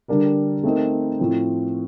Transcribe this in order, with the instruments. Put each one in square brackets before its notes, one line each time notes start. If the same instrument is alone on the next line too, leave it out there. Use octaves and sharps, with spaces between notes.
[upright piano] D3 G3 D4 G4 A#4
A3 C4 D#4 A#4
A2 F3 C4